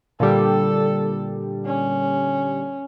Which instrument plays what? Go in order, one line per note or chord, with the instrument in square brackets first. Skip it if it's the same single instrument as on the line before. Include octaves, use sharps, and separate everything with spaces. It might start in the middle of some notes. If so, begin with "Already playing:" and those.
[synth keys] A#2 D3 G3 [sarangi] A4
[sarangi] C#4